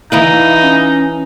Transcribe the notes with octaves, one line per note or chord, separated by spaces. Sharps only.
E3 D#4 E4 B4 F5
C#4